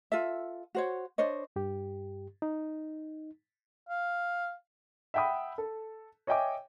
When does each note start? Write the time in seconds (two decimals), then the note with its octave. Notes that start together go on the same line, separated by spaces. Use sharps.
0.12 F4 A4 E5
0.75 F#4 C5 C#5
1.18 D4 C5 C#5 D#5
1.56 G2 G4
2.42 D#4
3.89 F5
5.14 E5 F#5 G5 B5 D#6
5.58 A4
6.27 C#5 D#5 E5 G5 G#5 D6